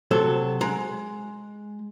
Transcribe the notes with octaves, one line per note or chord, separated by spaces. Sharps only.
C3 F#3 A4
G#3 A#5